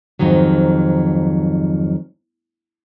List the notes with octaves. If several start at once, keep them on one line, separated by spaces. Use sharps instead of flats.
F2 G#2 D#3 F#3